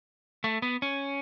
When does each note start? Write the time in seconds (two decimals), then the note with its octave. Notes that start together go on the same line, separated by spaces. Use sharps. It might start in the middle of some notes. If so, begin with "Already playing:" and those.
0.44 A3
0.62 B3
0.82 C#4